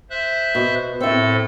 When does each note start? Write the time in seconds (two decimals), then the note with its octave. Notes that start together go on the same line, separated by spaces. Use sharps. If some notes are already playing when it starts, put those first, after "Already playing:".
0.10 C5 E5 F#6
0.55 B2
1.01 A2 C4 A4 E5 E6